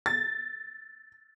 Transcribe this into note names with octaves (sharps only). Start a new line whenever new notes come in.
A6